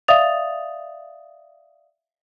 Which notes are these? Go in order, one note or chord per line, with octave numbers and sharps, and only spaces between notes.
D5 E5 F5 D#6 A6 F7